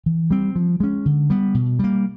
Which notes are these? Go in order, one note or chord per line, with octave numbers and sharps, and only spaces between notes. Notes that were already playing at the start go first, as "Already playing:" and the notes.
E3
G3 C4
F3
G#3 C#4
D3
G3 B3
B2
G3 A#3